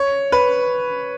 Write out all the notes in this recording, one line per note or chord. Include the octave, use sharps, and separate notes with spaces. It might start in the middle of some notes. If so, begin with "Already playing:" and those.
Already playing: C#5
B4